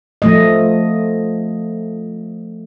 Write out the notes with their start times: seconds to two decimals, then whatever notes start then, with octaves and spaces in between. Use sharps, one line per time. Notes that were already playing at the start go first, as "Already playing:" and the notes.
0.22 F3 A3 D#5